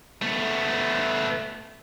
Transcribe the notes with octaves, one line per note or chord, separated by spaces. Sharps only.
A3 B3